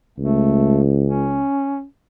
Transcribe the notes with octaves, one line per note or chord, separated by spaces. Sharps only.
C#2 A3
C#4